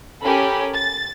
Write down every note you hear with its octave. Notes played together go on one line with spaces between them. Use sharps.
C#4 G4 A4 A#4 G#5 B5
A6